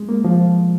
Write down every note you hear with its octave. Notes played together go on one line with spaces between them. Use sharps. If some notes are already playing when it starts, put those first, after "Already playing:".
Already playing: G#3
A#3
F3